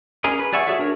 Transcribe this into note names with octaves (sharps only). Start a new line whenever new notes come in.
C#4 G#4 A#4 D#5
B4
G#4 D5 E5 F#5 C#6
F#4 G#4 A4 C#5 E5
D4 A#4 C#5